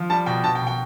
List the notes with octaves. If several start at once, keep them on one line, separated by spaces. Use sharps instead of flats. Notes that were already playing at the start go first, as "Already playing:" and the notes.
Already playing: F3
G3 A5
B2 G5
B2 A5
G5
B2
G5